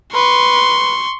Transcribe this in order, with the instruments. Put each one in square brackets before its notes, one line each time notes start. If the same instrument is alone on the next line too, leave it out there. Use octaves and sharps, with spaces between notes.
[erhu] B4 [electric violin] C6 C#6